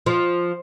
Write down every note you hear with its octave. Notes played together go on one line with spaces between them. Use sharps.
F3